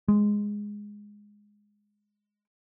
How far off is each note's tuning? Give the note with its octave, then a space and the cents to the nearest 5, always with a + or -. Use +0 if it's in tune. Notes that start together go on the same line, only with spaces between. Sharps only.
G#3 -5